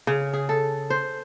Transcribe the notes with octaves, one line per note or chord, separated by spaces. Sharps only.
C#3
G#4
A4
C5